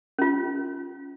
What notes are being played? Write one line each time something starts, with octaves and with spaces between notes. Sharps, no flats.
C#4 F4